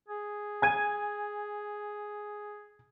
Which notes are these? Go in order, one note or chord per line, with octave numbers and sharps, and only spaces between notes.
G#4
G#5 G#6 D#7